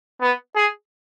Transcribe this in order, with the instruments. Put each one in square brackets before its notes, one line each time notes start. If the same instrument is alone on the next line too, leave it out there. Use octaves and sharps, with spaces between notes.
[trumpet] B3
G#4